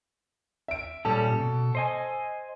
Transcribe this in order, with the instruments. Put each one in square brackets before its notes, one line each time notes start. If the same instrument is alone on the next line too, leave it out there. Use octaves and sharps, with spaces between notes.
[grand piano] E5 D7
[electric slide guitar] A#2 G3 C#4 [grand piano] A4
[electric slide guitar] B2
C5 D#5 G#5